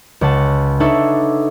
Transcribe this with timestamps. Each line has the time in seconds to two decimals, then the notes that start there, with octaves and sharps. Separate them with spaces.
0.21 C#2 C#5 F#5 A5
0.80 D4 D#4 A4 B4 C#5 E5